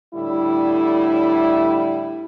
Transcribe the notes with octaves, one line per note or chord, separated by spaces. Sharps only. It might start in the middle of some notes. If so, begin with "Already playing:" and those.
A2 D3 G3 E4